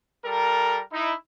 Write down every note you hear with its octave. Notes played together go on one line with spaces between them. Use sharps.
G3 A4 A#4
D#4 E4